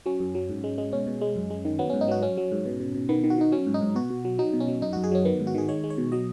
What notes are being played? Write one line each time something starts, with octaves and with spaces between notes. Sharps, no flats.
F#3 C#4
F#2
F#3
G#2
G#3
G#3
B2 C#4
B2
G#3
F#2
G#3
D#3
F#3 B3
G#2 C#4
D#4
F#3 F#4
F#3 C#4
F#3
G#2
B2
B2
B2
D#3 B3
D#3
F#4
D#3 D#4
F#3 C#4
G#2
D#4
G#2
B2 F#4
B2
F#3
F#3 D#4
B2
C#4
F#3
F#2 D#4
F#2 F#4
G#4
F#3 C#4
D#3 B3
G#2
F#4
D#3 G#4
G#3 C#5
G#3
C#5
B2
F#3 D#5